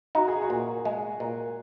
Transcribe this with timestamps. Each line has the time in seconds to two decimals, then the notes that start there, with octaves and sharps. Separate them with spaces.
0.15 D#4 F#4
0.28 G#4
0.42 F#4
0.50 A#2
0.85 G#3
1.20 A#2